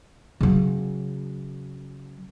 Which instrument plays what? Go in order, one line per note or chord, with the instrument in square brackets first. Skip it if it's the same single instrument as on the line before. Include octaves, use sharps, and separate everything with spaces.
[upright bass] C#3 F#3